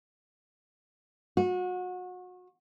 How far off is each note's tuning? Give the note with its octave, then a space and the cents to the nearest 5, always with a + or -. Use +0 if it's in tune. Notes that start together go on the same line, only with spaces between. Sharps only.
F#4 -30